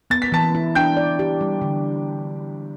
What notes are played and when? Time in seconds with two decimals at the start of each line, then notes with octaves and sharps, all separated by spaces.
0.10 B3 A6
0.22 B6
0.32 E3 A5 A6
0.55 E4
0.75 D4 G5 G6
0.97 D5
1.19 G4
1.41 G3
1.62 D3